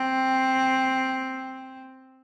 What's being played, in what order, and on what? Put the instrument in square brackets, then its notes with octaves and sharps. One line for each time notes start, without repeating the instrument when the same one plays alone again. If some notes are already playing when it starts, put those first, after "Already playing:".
Already playing: [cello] C4